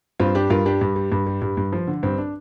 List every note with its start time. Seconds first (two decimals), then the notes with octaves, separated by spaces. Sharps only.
0.20 G2 C4 F4
0.35 G3 D4 G4
0.50 G2 F4 A#4
0.66 G3 D4 G4
0.81 G2
0.96 G3
1.12 G2
1.26 G3
1.42 G2
1.57 G2
1.73 F3
1.87 D3
2.03 G2 C4
2.18 D4